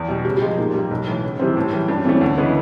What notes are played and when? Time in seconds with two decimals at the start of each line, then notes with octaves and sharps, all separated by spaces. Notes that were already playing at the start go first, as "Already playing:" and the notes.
Already playing: E2
0.08 B2 G3
0.25 C#3 G4
0.37 G4
0.42 F3 G#3
0.58 A#2 D#4
0.74 G3
0.79 A#3
0.91 B1
1.07 A2 E3
1.24 C#2
1.39 C3 E3 G3 C4
1.57 A2
1.73 E3 G3
1.88 G2 D4
1.98 C#4
2.05 E3 C4
2.09 A3 C#4
2.21 D2
2.38 C#3 E3 G#3 B3